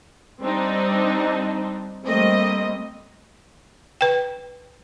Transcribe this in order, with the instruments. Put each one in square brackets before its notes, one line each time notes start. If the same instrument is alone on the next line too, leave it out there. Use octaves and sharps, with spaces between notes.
[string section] G3 C4 D4 D#4
G3 A3 A#3 C4 D#5
[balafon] B4 G5